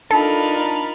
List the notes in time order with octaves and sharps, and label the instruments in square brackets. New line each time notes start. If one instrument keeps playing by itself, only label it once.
[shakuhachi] D4 [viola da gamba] D#4 F4 A#4 [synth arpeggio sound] A4 [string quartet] B5 F6 A6